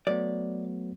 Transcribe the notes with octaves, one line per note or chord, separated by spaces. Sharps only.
F#3 A3 B3 D5